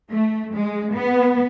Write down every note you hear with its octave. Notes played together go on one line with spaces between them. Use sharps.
A3
G#3
B3